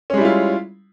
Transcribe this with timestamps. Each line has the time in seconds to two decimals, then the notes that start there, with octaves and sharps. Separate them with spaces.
0.10 C#4
0.14 G#3
0.17 G3
0.21 E4
0.25 F4